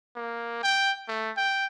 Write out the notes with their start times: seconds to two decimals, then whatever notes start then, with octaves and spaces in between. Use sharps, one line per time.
0.15 A#3
0.63 G5
1.08 A3
1.37 G5